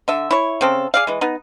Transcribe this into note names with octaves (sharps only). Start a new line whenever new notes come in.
D3 E5
E4 C#5
C#3 C4 A4
G#4 D5 F5
E3 G#3
B3 D#4